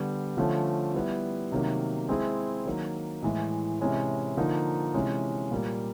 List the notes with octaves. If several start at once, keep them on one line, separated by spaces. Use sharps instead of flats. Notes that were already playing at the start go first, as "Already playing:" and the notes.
Already playing: D3 G3 B3
D3 F3 A3 C#4
G3 B3 E4
C3 D#3 F#3 A#3
G#3 C4 E4 G#4
D#3 F#3 A#3
A2 E3 G#3
C3 E3 G#3 C#4 E4
D3 F3 A#3 D#4
C3 E3 G#3 C#4
A#2 G3 A#3